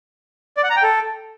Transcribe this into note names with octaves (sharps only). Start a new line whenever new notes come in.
D5
F#5
A#5
G5
A4